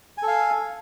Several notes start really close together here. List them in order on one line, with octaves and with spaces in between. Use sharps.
G#5 A4 F5